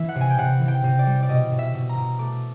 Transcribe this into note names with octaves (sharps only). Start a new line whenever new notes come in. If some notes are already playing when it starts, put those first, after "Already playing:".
Already playing: E3 E5
F#5
C3
G#5
G5
C3 F#5
E3
G5
C3
D5
G3
D5
B2 D#5
B2
E5
B2
A#5
B2
A3 D6